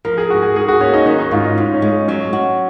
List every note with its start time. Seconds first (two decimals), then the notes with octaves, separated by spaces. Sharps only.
0.05 F3 A#4
0.18 G#4
0.30 G#2 F#4
0.42 G#4
0.55 G#2 G#4
0.68 F#4
0.81 A#3 C#4
0.94 D#4
1.06 D#3 C#4
1.19 D#4
1.31 G#2 F4
1.44 D#4
1.58 G#2 D#4
1.74 C#4
1.82 G#3
2.08 F#3 C#4
2.33 F#4